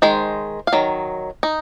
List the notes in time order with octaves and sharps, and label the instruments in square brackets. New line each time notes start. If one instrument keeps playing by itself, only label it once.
[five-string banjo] D#3 G#3 C5
F5
D#3 F#3
D#4